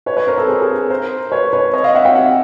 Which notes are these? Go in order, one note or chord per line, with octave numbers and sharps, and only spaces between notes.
B4 C#5
B4 C#5
A#4 C5
A4 B4
G#4 A#4
G#4 A#4
A#4 C5
B4 C#5
B4 C#5
C#5 D#5
D#5 F5
E5 F#5
F5 G5
E5 F#5